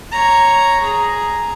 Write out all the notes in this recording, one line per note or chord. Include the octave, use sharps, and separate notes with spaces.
C#5 A#5
G#4 A#5